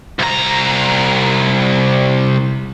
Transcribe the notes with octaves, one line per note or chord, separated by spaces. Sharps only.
C2 A#5